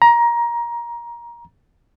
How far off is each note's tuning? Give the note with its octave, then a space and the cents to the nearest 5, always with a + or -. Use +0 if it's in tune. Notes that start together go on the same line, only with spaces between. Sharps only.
A#5 +20